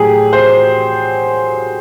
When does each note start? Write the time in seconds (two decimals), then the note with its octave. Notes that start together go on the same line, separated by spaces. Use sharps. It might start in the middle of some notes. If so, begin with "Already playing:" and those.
Already playing: A2 F#3 G4 G#4
0.33 C5